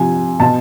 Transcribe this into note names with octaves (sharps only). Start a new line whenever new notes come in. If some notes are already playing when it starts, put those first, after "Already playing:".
Already playing: C3 F3 G#5
B2 A5